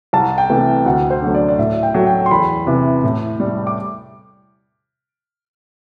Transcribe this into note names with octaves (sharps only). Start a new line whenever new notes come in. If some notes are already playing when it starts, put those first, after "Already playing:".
C2 A5
G5
C3 E3 A3
D2 F#5
C5
D3 F#3 A3
D5
D5
A2 E5
G5
F#3 A3
G5
C6
E2 B5
C3 E3
A2
G3
D6